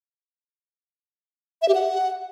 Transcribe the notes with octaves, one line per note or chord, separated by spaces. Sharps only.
E5
G4
F#5